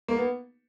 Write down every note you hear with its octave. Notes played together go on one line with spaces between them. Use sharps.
A#3
B3